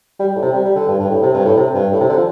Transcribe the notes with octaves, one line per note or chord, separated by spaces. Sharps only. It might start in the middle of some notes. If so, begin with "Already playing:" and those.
G3
A2
C3
G3
G3
D3
G2
G2
A2
C3
G2
A2
C3
G2
A2
C3
D3
F3